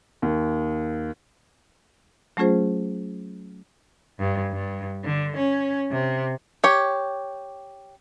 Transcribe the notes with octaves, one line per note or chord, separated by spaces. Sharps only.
D#2
F#3 A3 C#4 F4 G#4 C5
G2
G2
D3
C#4
C3
G4 C#5